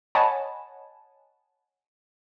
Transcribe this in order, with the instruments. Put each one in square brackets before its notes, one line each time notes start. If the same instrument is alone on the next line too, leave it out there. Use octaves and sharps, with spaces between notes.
[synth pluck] C#5 D#5 F#5 G#5 A5 B5